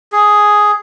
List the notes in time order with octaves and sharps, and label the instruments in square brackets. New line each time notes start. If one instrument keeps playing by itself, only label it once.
[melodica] G#4